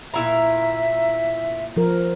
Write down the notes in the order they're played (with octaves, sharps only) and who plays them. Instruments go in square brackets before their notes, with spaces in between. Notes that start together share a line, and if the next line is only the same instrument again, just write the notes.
[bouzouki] A#2 E4 A#5 [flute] E5
[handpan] F3 A#4